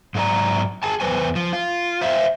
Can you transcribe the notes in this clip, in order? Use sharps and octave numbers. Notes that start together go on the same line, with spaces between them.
G#2 F#3 G#4 D5 A#5
G#4 G#5 A5
E2 G2 B4 C5 G#5
F3
F4
C5 E5 F5